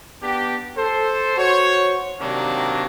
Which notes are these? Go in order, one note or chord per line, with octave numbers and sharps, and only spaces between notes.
B3 D4 G4
A4 C5
F#4 C5 C#5
C3 D#3 F#3 A#3 D4